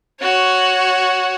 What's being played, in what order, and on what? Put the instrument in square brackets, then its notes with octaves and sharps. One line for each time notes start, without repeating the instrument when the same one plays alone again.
[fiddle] F#4 C#5